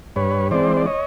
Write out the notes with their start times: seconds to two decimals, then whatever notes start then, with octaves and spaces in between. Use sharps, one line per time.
0.16 G2 B4 C#5
0.51 E3 G#3 C4 C5 D5
0.77 D5
0.86 C#5 D#5